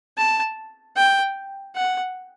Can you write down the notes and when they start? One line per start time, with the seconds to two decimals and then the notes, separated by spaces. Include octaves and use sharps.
0.17 A5
0.96 G5
1.75 F#5